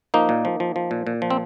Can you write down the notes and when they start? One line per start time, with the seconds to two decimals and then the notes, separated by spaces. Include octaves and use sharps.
0.14 F3 A#3 D#4
0.29 A#2
0.45 F3
0.60 F3
0.76 F3
0.91 A#2
1.07 A#2
1.22 F3
1.30 C4